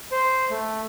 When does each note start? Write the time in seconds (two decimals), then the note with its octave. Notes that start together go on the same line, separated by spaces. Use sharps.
0.12 C5
0.51 A3